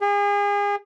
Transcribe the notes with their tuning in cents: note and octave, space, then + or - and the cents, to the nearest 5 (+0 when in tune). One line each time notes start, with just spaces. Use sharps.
G#4 -35